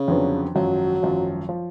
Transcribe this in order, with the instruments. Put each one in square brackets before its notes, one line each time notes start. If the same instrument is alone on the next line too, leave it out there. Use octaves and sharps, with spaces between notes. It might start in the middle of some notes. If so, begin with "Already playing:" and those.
Already playing: [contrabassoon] C#3
[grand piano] F2 D3 F#3 B3 D4
[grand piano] G#1 F#2 F3 [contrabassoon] F#3
[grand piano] G#1 F#2 F3
F3